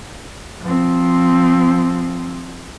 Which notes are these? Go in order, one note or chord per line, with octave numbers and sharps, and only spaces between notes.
F3 C4